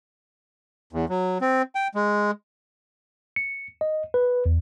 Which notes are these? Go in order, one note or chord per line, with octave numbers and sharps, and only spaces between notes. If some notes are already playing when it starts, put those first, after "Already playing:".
E2
F#3
C4
G5
G#3
C#7
D#5
B4
E2